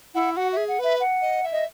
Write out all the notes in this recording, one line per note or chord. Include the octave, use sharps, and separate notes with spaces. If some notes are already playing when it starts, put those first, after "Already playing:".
E4 F#5
F#4 F#5
G#4 E5
F#5
B4 E5
F#5
D#5
E5
D#5